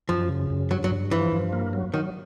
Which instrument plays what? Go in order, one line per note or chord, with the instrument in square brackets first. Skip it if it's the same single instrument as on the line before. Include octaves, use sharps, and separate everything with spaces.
[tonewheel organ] F#2 [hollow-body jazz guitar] F3
[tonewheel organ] C#3
F#2
[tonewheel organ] G2 [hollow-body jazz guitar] F#3
[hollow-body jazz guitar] F#3
[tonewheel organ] G2
[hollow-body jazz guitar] E3 [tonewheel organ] F3
[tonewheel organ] G2
A#3
F#3
[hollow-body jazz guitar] D#3 [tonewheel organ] F#3